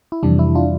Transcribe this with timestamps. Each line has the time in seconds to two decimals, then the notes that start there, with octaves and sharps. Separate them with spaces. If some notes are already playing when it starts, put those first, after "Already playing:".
0.12 E4
0.23 F2 C3 E3 G3 D4
0.39 E4
0.55 D4 F4